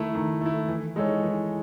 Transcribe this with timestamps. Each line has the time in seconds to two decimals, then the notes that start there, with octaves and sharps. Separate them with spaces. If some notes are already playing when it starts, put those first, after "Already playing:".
Already playing: D#3 A3 E4
0.15 D#3
0.41 A3 E4
0.68 E3
0.96 G#3 D#4 A4 C#5
1.23 E3